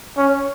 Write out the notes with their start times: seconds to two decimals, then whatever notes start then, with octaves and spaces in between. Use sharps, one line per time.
0.17 C#4